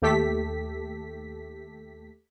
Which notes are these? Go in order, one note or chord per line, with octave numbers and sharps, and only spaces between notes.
D#2 A3 G4 A4 B6